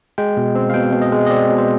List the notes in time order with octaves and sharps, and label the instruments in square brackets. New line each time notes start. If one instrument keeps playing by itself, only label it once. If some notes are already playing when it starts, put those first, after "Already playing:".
[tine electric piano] G#3 G5
B2
C4
F5
B2 G5
B2
D#5
G#3
D#5
C4 D5
B2
C5